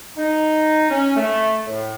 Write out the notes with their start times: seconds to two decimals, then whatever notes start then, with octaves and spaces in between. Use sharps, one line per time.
0.17 D#4
0.89 C#4
1.16 A3
1.67 A2